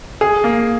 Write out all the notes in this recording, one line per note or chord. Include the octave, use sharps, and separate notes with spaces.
G#4
A#3